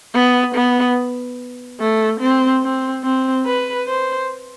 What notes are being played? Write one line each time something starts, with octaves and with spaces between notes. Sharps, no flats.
B3
B3
A3
C4
C4
C4
B4
C5